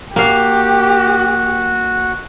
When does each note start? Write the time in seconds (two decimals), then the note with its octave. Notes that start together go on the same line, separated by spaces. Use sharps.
0.16 A#3 F#4 G4 F5